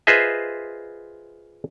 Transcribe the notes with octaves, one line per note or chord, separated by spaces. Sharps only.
F4 G#4 B4 C5 D#5 E5